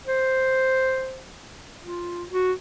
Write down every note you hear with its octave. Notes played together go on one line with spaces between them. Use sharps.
C5
F4
F#4